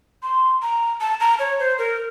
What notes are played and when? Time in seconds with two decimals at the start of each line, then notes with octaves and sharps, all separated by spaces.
0.23 C6
0.62 A#5
1.01 A5
1.20 A#5
1.39 C#5
1.59 C5
1.79 A#4